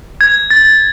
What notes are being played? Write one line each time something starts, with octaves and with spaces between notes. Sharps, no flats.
G#6
A6